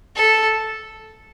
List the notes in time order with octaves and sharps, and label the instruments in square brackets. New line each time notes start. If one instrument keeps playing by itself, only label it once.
[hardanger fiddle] A4